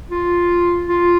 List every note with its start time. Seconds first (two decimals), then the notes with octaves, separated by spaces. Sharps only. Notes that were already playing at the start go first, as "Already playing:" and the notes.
0.11 F4
0.89 F4